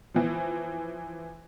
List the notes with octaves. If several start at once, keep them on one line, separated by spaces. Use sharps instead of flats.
E3 F3